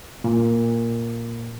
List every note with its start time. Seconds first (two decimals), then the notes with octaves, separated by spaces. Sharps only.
0.24 A#2